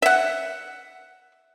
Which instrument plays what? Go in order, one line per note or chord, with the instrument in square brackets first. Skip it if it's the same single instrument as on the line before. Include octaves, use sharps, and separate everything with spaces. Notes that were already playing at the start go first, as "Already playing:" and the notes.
[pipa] E5 F#5